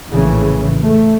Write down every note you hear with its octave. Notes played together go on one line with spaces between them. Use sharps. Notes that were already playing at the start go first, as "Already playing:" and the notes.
A#1 A2 C#3 E3
A3